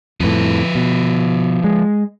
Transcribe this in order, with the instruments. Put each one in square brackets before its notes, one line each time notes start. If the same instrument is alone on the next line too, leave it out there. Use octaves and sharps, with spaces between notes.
[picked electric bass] F2 A2 [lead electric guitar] F3 B4
[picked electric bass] B2
G#3